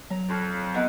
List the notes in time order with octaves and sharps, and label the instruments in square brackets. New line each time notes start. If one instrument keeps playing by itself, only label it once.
[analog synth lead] F#3 [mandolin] A#5
[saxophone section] F2
[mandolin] B3 D#4 E4